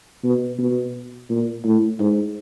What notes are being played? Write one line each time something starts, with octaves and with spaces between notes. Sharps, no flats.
B2
B2
A#2
A2
G#2